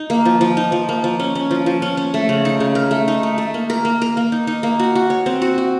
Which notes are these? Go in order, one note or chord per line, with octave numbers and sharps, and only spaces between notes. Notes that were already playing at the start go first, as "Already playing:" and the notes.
Already playing: D#4
A#3
F3
F3
D#4
F3
A#3
F3
C#4
C#4
F3
F3
C#4
C#4
A3
C#3
D#4
C#3
A#4
A3
D#4
A3
A3
A#3
A#4
A#3
A#4
A#3
D#4
D#4
A#3
F#4
F#4
C#5
C4
F#4
F#4